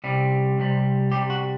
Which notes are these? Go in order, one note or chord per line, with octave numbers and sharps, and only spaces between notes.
C2 C3 G3
C2 C3 G3
C2 C3 G3 G4
F#4